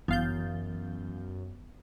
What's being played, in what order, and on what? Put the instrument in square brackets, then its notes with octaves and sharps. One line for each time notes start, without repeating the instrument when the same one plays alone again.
[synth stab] G1 F5 G6 [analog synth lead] F#2 [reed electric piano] E3 [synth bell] B3 A6